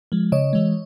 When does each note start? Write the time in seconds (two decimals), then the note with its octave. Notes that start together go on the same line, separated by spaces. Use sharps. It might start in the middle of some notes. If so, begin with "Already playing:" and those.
0.12 F3 G#3
0.32 C#3 C#5 D#5
0.53 E3 G#3